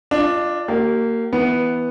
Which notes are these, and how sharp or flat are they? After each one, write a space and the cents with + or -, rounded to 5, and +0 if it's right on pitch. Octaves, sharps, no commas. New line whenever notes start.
D4 +0 F4 -10 D#5 -45
A#3 -20 G4 -45
E3 -15 B3 +0